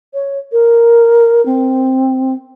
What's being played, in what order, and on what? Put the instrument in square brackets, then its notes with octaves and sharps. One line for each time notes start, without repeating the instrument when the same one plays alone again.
[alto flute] C#5
A#4
C4